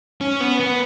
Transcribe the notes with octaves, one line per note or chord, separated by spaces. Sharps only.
C#4
B3
B3